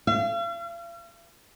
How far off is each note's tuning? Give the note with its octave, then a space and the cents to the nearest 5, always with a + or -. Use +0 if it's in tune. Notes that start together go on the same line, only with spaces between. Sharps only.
F5 -40